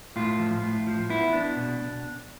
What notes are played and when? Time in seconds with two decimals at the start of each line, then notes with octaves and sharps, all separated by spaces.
0.16 A2 F4
0.39 F3
0.63 A2
0.87 F3
1.09 B3 E4
1.33 B3 D4
1.56 B2
1.80 B2